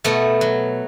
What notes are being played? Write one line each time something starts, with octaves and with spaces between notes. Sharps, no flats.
B2 A3 B3
F#3